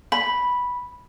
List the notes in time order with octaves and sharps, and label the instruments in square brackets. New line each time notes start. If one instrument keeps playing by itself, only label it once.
[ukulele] B5